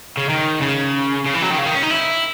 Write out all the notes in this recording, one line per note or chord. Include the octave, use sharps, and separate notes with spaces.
C#3
D#3
C#3
C#3
E3
F#3
D#3
C#3
D#3
C#4
D#4
E4